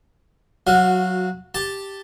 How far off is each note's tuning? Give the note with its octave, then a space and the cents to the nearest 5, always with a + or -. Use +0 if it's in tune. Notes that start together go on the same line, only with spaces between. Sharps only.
F#3 +0 F#4 -20 F5 +0
G4 +0 A5 +0